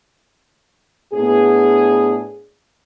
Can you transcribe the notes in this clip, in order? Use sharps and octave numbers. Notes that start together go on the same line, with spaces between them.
A2 B3 D4 G#4